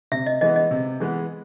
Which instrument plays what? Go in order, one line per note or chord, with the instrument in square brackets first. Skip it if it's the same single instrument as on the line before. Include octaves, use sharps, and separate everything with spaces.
[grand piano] C3 [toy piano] E5
[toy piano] D#5
[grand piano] E3 G#3 B3 [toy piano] D#5
[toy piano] D#5
[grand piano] C3
E3 G#3 B3